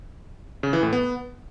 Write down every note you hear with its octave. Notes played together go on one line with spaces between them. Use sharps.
C#3
E3
A2
B3